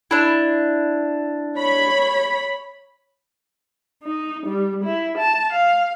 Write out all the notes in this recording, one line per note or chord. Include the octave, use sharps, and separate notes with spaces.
D4 E4
C#5 B5
D#4
G3
E4
A5
F5